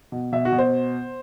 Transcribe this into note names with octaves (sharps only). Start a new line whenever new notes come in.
B2
B2 E5
F#4
B2
C5